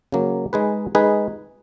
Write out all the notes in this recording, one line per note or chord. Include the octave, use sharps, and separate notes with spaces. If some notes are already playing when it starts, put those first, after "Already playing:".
C#3 F#3 A#3
G#3 D#4 G#4 B4
G#3 D#4 G#4 B4